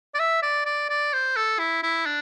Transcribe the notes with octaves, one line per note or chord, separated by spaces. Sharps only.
D5
E5
D5
D5
D5
C5
A4
E4
E4
D4